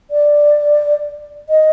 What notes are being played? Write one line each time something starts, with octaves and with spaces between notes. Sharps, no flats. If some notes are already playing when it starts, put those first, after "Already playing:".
D5
D#5